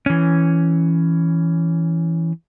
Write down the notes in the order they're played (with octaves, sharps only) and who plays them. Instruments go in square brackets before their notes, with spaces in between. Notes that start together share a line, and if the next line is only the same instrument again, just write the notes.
[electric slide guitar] E3 C#4